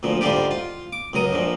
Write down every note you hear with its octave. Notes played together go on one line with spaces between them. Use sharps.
D2 A#2 F3
G#2 D3 G3 F4 G4
F4
D6
C#2 F#2 A#4 D#6
A#1 A#2 F3